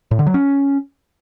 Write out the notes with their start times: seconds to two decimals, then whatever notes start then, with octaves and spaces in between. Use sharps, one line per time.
0.11 A2
0.19 D3
0.27 F#3
0.34 C#4